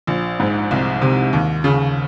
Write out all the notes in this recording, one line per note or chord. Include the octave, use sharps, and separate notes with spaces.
A#1
G#2
C2
C3
D#2
C#3